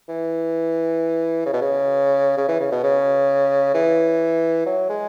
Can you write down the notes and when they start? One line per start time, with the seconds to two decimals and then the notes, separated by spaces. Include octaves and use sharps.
0.09 E3
1.46 C#3
1.53 B2
1.61 C#3
2.37 C#3
2.48 E3
2.60 C#3
2.72 B2
2.83 C#3
3.74 E3
4.66 F#3
4.89 G#3